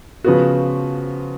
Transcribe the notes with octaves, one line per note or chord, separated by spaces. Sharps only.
C#3 F3 B3 F#4